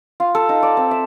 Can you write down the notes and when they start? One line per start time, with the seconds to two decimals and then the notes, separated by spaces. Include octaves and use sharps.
0.20 F4
0.35 A4
0.49 D#4
0.63 D5
0.77 C4
0.91 E5